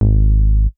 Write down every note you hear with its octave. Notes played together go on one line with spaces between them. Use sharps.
G#1